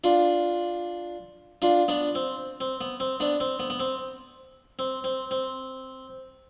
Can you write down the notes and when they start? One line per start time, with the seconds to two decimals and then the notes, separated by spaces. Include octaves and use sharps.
0.04 D4 F4
1.62 D4 F4
1.88 B3 D4
2.15 C4
2.61 C4
2.81 B3
3.00 C4
3.20 B3 D4
3.40 C4
3.60 B3
3.70 B3
3.80 C4
4.79 C4
5.04 C4
5.31 C4